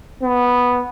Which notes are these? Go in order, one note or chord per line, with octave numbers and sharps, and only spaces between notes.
B3